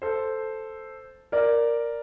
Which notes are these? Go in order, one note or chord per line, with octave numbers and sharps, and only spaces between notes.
A4 C5
A#4 D5